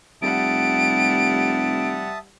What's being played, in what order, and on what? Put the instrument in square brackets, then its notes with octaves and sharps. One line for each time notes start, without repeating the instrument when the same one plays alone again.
[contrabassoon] F1 [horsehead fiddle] G3 F#5 [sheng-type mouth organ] E5 A5 D#6 [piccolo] D7